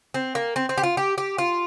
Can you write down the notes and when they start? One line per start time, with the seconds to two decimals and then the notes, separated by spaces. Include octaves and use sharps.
0.14 C4
0.35 A#3
0.56 C4
0.69 C4
0.78 G4
0.83 F4
0.97 G4
1.18 G4
1.38 F4